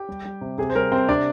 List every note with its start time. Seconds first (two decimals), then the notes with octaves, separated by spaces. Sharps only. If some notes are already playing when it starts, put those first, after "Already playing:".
Already playing: G4 G5
0.09 G3
0.25 G3
0.41 C3
0.58 C3 G#4
0.70 C5
0.75 G3 A#4
0.91 C3 C4 C5
1.08 C3 D4 D5